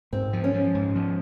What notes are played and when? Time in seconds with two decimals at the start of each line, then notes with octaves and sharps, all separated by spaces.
0.12 G#2 C4
0.33 F3
0.44 C#4
0.54 F3
0.75 G#2
0.95 F3